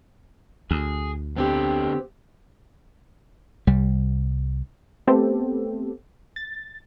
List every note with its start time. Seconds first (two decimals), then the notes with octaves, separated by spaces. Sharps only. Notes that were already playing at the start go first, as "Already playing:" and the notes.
0.71 D2 G#4
1.36 F2 D3 B3 C4 G4
3.67 C2 G3
5.07 A3 B3 C4 G4 A4
6.36 A6